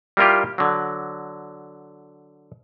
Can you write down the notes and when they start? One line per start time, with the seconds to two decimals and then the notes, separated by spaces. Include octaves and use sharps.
0.17 G3 A#3 E4 F4 G4
0.58 D3 F#3